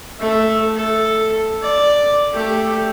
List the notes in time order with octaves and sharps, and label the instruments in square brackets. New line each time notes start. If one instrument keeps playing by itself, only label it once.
[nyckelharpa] A3 E5
A4
D5
A3 G4